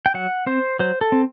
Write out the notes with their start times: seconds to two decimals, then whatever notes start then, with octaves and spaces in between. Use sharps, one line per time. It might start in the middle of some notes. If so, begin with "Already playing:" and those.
0.06 G5
0.14 F#3 F#5
0.46 C4 C5
0.79 F#3 C5
1.01 A4
1.12 C4